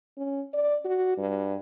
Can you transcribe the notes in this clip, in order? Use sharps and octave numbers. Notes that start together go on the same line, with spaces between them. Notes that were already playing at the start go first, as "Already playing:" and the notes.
C#4
D5
F#4
G2